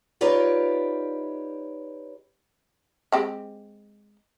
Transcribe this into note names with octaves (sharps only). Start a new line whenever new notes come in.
D#4 F4 G4 B4 C#5 D5
G#3 C4 G4